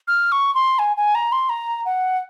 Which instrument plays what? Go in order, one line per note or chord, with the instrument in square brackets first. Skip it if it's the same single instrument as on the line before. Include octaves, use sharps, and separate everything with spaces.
[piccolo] F6
C#6
C6
G#5
G#5
A#5
C6
A#5
F#5